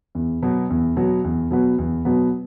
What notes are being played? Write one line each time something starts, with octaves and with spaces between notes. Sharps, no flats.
E2
B2 F#3 B3
E2
B2 F#3 B3
E2
B2 F#3 B3
E2
B2 F#3 B3